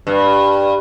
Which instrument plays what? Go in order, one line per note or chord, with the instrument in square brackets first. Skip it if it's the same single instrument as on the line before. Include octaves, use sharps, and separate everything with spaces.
[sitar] G2